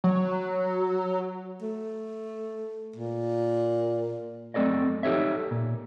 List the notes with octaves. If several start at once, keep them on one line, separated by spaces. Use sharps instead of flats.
F#3
A3
A#2
F#2 A3 C4 A4 D5 D#5
D#4 G4 A4 C#5 E5
A#2